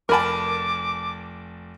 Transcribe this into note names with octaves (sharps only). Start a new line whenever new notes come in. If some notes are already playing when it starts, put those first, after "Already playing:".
F1 A#4 G#5 A5 B5 D6